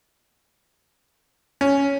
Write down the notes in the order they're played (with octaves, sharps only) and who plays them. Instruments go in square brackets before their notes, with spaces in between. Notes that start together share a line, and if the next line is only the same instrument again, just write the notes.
[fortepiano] C#4